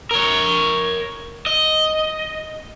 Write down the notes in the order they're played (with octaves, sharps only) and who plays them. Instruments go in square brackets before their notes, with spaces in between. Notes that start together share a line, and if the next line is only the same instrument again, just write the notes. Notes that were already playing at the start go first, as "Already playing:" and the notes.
[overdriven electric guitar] A#4 C#5
D#5